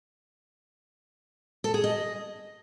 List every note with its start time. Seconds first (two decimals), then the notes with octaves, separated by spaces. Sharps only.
1.64 A4
1.74 G#4
1.84 D#5